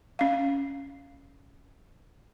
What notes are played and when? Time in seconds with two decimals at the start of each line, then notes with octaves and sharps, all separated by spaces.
0.19 C#4 F5